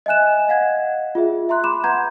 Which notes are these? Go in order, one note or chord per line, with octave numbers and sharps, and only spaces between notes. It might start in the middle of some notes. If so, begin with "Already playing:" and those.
D#5 E5 G#5 F#6 E7
D#5 F5 F#5 G#6
F4 G#4 E5
E5 A#5 C6 F#6
B5 C6 D6 E7
B4 F#5 A#5 G6 G#6